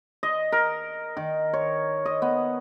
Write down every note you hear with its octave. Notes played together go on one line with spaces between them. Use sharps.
D#5
A#4
D#3
C#5
D#5
B3